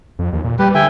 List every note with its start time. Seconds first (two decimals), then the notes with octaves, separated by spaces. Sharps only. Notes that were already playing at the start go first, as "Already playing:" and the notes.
0.19 F2
0.33 D#2
0.44 A#2
0.59 G3 G4 B4
0.75 D3 E5 G5 G#5